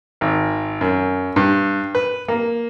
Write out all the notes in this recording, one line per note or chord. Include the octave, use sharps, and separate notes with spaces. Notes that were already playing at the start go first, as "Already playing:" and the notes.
G#1
F#2
G2
B4
A#3